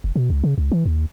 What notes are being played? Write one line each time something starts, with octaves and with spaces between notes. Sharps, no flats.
F1
B2
C#2
C#3
C#2
E3
D#2